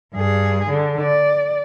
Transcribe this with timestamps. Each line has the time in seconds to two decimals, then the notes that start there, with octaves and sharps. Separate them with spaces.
0.14 G2 G#4
0.70 D3
1.01 D5